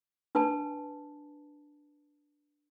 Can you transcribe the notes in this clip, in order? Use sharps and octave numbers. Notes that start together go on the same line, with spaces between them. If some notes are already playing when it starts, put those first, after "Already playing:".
D4 B4 G#5 A5